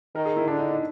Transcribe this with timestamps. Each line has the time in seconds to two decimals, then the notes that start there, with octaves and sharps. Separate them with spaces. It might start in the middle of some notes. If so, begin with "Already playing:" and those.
0.15 D#3 A#4
0.25 G#4
0.37 E4
0.48 D3 D4
0.59 D#4
0.70 D#4